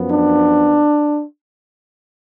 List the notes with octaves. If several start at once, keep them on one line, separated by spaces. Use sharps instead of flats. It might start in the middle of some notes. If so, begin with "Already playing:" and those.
Already playing: F#2 F3 B3
D4